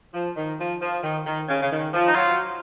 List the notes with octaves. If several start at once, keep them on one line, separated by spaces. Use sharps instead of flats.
F3
D#3
F3
F3
D#3
D#3
C#3
C#3
D#3
F3
D#4
F#3 F4